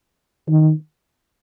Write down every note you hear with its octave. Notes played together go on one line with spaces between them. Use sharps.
D#3